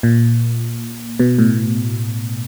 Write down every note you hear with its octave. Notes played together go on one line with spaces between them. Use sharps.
A#2
B2
A2